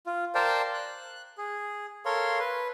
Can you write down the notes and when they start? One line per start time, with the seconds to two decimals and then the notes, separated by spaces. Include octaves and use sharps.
0.06 F4
0.35 A#4 C5 D5 F5 G5 A5
0.74 F#6
1.38 G#4
2.05 A4 A#4 C#5 F5 C6
2.39 B4